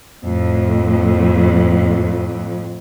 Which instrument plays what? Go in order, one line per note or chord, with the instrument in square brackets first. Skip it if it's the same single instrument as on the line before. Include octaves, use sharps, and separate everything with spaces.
[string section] F2 A2